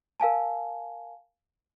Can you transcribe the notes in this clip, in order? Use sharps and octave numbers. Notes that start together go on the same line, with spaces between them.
A#4 F5 G#5 A5